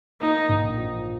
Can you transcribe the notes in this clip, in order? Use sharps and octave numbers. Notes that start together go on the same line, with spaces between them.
A#3 D#4
A#1
F3